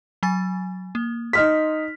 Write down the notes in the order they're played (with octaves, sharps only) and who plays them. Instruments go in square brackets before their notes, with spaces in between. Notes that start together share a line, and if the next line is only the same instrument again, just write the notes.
[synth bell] F#3 G#5 A6
A#3
[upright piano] D#4 F6 B6 [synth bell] C6